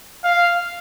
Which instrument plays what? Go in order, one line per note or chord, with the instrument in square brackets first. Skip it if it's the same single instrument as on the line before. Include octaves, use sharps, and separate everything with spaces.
[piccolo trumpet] F5